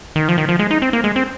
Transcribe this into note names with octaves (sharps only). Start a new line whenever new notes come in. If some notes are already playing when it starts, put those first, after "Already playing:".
D#3
F3
D#3
F3
G#3
D#4
C4
A#3
G#3
C4